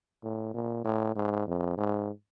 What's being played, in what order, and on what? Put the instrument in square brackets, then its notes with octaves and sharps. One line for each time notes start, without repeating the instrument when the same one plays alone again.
[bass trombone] A2
A#2
A2
G#2
F2
G#2